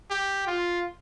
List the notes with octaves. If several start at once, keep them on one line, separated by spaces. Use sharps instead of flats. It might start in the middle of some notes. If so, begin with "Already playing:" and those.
G4
F4